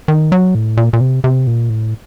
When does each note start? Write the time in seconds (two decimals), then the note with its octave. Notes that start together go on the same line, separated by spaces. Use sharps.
0.08 D#3
0.32 F#3
0.55 A2
0.77 A#2
0.93 A#2
1.01 C3
1.24 C3
1.47 A#2
1.70 A2